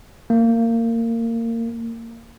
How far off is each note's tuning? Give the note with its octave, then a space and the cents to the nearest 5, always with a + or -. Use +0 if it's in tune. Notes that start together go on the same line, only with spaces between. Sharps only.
A#3 -25